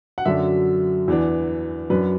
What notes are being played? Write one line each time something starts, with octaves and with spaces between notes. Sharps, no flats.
F#5
F#2 D3 F#3 D4 E5
E2 E3 D4
F#2 F#3 D4 B4